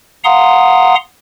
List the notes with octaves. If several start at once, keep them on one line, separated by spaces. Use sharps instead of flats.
F5 F#5 A#5 C6 D#6